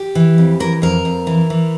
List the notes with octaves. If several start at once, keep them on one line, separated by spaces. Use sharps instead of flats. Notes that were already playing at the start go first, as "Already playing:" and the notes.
Already playing: G4
E3
F2
E3 A#4
F2 A#4
F2
E3
E3